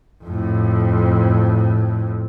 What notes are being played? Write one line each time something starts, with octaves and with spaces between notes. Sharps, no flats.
F2 A2